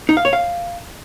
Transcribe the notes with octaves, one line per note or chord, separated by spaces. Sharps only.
D#4
F5
C#5
F5